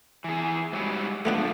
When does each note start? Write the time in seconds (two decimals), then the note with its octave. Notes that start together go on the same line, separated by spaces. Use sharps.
0.24 E3 G#4
0.72 G#2 F#3 G3
1.25 D3 F3 A3 B3 D4